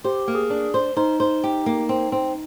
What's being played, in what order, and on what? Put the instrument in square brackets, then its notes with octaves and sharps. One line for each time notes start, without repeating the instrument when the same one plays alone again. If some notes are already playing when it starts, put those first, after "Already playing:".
[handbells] G4 [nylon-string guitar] C5
[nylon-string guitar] A#3
[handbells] G#4
[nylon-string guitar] D4
C5
[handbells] D#4 [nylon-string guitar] C5
[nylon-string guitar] C5
G4
A#3
C4
C4